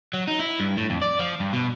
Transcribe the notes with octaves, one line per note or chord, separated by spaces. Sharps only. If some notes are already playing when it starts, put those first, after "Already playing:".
F#3
D#4
E4
G2
A2
F2
D5
F3
G2
B2